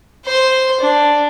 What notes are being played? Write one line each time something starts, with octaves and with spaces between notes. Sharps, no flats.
C5 C6
D4